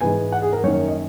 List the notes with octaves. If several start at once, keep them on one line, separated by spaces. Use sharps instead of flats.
G#2 E3 B3 G#5
F#5
G#4
A#4
F#2 D#3 A#3 C#5
D#5